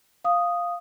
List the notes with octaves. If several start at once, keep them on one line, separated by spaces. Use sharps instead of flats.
F5 D#6